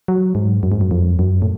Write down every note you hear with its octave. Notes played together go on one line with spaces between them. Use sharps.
F#3
G#2
F#2
G#2
F#2
F2
F#2
A2